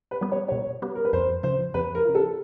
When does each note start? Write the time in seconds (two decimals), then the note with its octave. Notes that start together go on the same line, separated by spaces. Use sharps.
0.11 B4
0.21 G3 B3
0.32 C#5
0.48 B2 C#5
0.82 G3 B3
0.95 A#4
1.05 B4
1.13 F2 C5
1.43 C#3 F3 C5
1.74 F2 B4
1.95 A#4
2.05 C#3 F3
2.15 A4